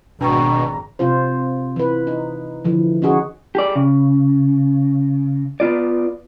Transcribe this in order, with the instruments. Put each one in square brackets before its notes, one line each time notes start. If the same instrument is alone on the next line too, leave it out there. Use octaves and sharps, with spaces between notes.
[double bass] G#1 [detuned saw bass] B2 [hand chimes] D4 G5 C#6 [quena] A#5
[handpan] C3 C4 F4 C5
E3 B4
D#4
D3 E3 F3
C#4 D#4 F#4 G#4
[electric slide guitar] G4 G#4 D5
C#3
B3 F4 D5